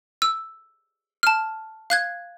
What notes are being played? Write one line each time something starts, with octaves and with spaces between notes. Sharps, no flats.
E6
A5 F6
F5 F#6 G#6